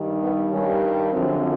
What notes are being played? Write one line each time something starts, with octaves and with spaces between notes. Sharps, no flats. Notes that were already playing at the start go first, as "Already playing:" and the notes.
Already playing: G2 D#3 G3
B3
G2 D#3 G3 C#4
F#2 D3 F3 C4